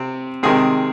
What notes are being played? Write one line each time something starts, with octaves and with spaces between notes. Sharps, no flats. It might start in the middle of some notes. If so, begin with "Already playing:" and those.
Already playing: C3 C4
C3 D#3 G#3 C4 G#4